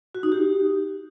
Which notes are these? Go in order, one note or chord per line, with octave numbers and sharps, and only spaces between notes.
F#4
D#4
G4